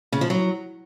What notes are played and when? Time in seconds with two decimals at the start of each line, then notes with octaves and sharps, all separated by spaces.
0.12 C#3
0.21 F3
0.30 F#3